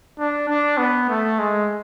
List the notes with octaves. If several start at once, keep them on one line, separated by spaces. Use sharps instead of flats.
D4
D4
B3
A3
G#3